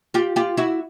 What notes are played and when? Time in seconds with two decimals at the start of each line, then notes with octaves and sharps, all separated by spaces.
0.14 F4 G4
0.36 F4 G4
0.57 E4 F#4